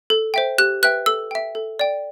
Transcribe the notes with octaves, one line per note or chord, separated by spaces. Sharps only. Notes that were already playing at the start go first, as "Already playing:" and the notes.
A4
C5 E5 G5
G4 F#6
B4 E5 G5 F#6
A4 E6
E5 G5
A4
D5 G5